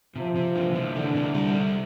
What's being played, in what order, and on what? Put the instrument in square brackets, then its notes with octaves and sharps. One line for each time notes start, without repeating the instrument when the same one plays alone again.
[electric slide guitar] C3 [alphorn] F3
[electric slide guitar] C3
E3
C3
[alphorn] D3 [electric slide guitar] E3
[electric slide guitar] C3
G3
C3